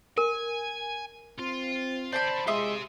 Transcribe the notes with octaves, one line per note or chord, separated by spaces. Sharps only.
A#4 G#5
C4 F4
D3 C5 D5 A5 B5
G#3 F4 G4 E5 C6 D#6